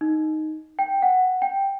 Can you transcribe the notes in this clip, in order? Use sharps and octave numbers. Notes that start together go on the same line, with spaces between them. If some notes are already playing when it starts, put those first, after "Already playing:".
D#4
G5
F#5
G5